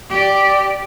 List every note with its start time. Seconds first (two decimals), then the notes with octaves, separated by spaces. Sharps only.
0.10 G4 D5